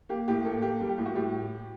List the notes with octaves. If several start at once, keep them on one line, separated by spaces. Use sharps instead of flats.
A#3 G4
A2 G4
A#3 A4
A#3 G4
G3
G4
A2
F#4
A2 G4